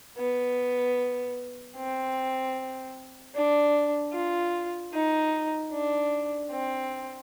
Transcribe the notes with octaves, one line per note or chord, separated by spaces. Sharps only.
B3
C4
D4
F4
D#4
D4
C4